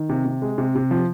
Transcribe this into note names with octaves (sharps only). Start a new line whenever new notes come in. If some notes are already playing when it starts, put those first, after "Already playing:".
Already playing: D#3
C3
C3
G#3
C3
C3
F3